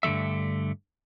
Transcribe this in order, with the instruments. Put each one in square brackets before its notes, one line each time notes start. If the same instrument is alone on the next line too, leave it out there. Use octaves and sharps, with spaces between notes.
[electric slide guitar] G2 D3 G#3 A3 E5